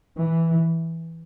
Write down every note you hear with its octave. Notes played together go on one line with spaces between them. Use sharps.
E3